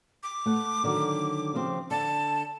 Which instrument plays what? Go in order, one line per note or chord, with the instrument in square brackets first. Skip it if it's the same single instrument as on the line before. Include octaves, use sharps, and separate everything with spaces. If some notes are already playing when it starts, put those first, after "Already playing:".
[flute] D6
[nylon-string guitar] A3 F#5
D3 D#3 F#3
C#3 F3 C4
[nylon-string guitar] D3 [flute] A5